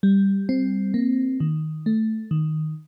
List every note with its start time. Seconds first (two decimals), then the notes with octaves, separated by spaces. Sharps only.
0.03 G3
0.49 C4
0.94 A#3
1.40 D#3
1.86 A3
2.31 D#3